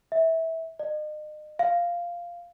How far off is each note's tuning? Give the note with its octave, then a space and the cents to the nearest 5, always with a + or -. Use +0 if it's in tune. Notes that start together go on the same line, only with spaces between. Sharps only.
E5 -20
D#5 -40
F5 -5